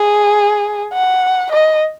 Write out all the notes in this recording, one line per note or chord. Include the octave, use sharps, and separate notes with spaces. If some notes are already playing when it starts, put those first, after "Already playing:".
Already playing: G#4
F#5
D#5